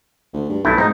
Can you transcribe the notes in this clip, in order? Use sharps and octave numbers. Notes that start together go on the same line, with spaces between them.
D2
G2
B1 G2 A3 E4
G#2 C4 D#4